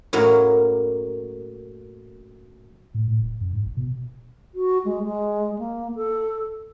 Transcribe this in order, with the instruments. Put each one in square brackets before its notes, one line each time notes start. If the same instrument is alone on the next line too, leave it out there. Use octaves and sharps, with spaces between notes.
[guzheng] F#2 A2 F#3 A#3
[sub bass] A2
A2
D1
F#2
G#2
G#1
B2
[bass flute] F#4
G#3
G#3
A#3
A4